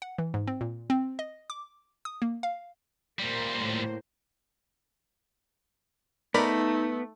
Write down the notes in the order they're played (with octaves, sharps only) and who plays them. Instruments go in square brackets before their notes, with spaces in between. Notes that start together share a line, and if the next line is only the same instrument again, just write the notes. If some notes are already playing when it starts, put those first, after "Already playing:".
[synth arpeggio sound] F#5
E3
G#2
C4
A#2
C4
D#5
D6
D#6
A#3
F5
[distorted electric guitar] A#2 G3 [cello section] A#3 C5
[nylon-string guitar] A2
[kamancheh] A3 [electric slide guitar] B3 [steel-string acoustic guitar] D#4 [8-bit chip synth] A#4 D5 B5